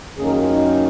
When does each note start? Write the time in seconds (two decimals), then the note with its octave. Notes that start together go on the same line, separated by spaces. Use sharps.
0.17 F#2 D#3 A#3 C#4 G#4
0.26 A#4
0.34 G#4
0.42 F4
0.49 D#4